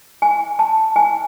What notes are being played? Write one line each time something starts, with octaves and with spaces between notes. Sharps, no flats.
G#5
A5
G#5